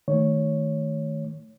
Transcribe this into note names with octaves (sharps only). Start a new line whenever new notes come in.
D#3 A3 C#5